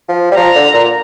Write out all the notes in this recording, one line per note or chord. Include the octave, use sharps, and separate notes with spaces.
F3
G3
F3 A#5
D3
A#2